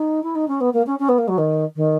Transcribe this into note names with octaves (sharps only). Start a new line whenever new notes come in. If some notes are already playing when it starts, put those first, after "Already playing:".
Already playing: D#4
E4
D#4
C#4
B3
A#3
C#4
C#4
B3
A#3
F#3
D#3
D#3